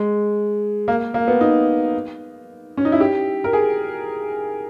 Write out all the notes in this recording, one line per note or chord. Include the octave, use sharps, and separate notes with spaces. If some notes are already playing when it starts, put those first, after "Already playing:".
Already playing: G#3
A#3
A#3
B3
D#4
C#4
D#4
E4
G4
A#4
G#4